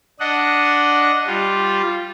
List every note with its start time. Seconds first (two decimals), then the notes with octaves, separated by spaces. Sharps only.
0.20 D4 D#5 F#5
1.27 G3 F4